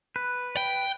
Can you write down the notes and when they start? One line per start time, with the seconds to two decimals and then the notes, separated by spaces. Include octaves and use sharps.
0.16 B4
0.57 G5